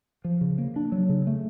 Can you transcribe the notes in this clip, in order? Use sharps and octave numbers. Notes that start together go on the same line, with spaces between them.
F3
C#3
A#3
D4
F#3
C#3
A3